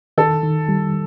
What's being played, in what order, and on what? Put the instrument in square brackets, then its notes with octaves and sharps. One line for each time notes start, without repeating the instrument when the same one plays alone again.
[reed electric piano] D#3 [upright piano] A4
[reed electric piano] D#3
G3